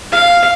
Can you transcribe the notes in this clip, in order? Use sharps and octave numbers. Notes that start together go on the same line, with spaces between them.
F5